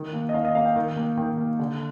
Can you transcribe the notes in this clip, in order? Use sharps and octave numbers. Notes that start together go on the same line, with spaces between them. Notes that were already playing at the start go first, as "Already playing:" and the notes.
Already playing: D#3
A#3
D#5
D#3 F5
D#5
A#3 F5
G5
D#3
A#3
D#3 G5
A#3
D3